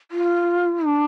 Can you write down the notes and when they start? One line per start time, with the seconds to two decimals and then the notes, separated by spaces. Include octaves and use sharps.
0.11 F4
0.85 D4